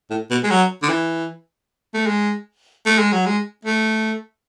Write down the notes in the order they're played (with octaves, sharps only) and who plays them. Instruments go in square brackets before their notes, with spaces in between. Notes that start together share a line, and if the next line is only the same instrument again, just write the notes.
[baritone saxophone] A2
B2
G#3
F#3
D3
E3
A3
G#3
A3
G#3
F#3
G#3
A3